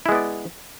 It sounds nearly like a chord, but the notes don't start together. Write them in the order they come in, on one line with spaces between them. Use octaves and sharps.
E4 G#3 B3 D5